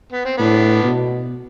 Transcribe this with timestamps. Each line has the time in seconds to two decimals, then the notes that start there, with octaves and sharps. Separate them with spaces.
0.12 B3
0.25 C4
0.38 A2 B3 D4
0.83 B2